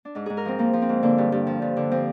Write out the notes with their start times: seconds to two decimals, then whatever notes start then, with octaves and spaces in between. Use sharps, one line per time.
0.05 D4
0.15 G#2 D#4
0.26 G#2 G#4
0.37 A#4
0.45 F3 C4
0.58 F3 A#3
0.73 F3
0.82 C4
0.89 G#2
1.03 D3 A#3
1.18 G2
1.32 G2
1.47 F3
1.62 G2
1.77 D3
1.91 F3 C4